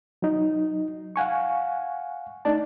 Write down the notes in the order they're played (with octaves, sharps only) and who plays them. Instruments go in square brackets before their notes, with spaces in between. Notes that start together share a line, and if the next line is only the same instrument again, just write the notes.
[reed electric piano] F#3 D#4
F5 F#5 G#5 C#6
A3 D4 D#4 D5 A5